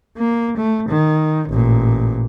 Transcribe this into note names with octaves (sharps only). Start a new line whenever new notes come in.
A#3
A3
D#3
A1 A#2